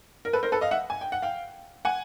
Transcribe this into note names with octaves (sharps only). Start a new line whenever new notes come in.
A#4
A4 B4
A#4 C5
A4 B4
D#5 F5
E5 F#5
G#5
G5
F#5
F5 G5
F#5 G#5